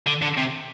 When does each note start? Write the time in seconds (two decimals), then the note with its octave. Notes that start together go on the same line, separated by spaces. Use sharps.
0.07 D3
0.22 D3
0.38 C3